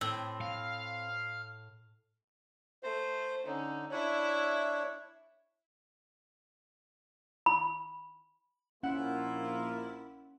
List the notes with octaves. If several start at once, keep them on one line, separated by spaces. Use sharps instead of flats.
A2 C4
F5
A3 C5
D3 C#4 D#4
D4 E4 C#5 E5
B5
A#1 A#3 C#4 E4 F4 F#5